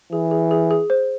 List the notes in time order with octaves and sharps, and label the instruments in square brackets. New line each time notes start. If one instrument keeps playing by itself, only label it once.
[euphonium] E3 [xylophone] G#4
[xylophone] G#4
G#4
G#4
C5